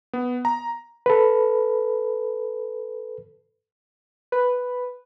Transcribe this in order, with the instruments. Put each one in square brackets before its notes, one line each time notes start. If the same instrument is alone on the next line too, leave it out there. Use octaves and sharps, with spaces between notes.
[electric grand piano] B3
A#5
[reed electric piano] A4 B4
[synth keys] B4